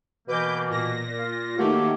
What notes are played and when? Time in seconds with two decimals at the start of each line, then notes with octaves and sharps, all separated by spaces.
0.28 B2 E3 A#3 B4 D6 G6
0.69 A#2 A#6
1.18 F4
1.57 D#3 A3 A#3 F#4 G4 C#5